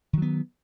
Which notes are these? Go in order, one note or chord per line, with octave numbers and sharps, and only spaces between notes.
D#3 F#3 B3